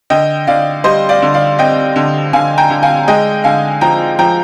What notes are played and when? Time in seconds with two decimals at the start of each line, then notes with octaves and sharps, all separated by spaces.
0.10 D3 D#5 G5
0.47 D3 D5 F5
0.84 G3 C5 D#5
1.09 D5 F5
1.22 D3
1.34 D5 F5
1.59 C4 D#5 G5
1.96 D3
2.33 D3 F5 G#5
2.58 G5 A#5
2.70 D3
2.83 F5 G#5
3.08 G#3 D#5 G5
3.44 D3 F5 G#5
3.81 F3 G5 A#5
4.19 F3 G5 A#5